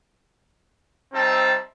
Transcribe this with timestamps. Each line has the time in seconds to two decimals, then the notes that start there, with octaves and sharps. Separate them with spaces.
1.13 G3 C4 D#4 E5 A5